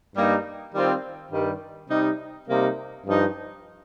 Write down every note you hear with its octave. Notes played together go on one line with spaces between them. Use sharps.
G2 G3 A#3 D#4
D#3 G3 C4 F4
G2 D#3 G3
C3 G3 D#4
C3 G3 A#3 D#4
G2 F3 D#4